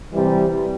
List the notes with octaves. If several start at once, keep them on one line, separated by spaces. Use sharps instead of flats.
C3 E3 G3